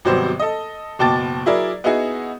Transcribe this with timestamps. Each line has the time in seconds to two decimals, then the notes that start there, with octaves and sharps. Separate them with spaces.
0.05 G#1 C3 F#3 G3 B3 C5
0.40 A4 D#5
0.99 F#1 B2 G5 A5 D6 A6
1.46 F#3 E4 G#4 A#4 D5
1.84 B3 D#4 E4 F#4 G#4